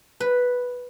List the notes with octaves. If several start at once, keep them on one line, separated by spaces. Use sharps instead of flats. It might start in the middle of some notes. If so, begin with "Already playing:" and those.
B4